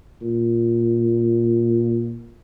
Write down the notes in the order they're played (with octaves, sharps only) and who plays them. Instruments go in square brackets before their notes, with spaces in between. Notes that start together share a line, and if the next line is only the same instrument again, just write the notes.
[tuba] A#2